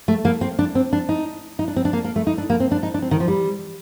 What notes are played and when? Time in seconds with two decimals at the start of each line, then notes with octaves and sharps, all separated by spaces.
0.08 A3
0.25 A#3
0.41 C4
0.59 D4
0.75 C4
0.93 D4
1.09 D#4
1.59 D#4
1.68 D4
1.76 C4
1.85 D4
1.93 A#3
2.04 A#3
2.16 A3
2.27 D#4
2.38 D4
2.50 A#3
2.60 C4
2.71 D4
2.83 D#4
2.94 D4
3.02 C4
3.11 D#3
3.20 F3
3.28 G3